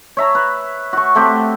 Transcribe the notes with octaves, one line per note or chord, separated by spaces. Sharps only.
C#5 E5 A#5
B4
F#4 C#6
A3 C4 G4